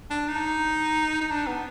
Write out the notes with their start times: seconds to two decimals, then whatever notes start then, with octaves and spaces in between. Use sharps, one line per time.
0.10 D4
0.28 D#4
1.21 D#4
1.30 D4
1.47 B3